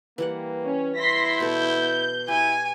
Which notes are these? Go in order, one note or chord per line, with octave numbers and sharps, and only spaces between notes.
E3 G3 A#3 F#5
C#4
E4 C6 A#6 B6
B2 A4 G6
E4 G4 G#5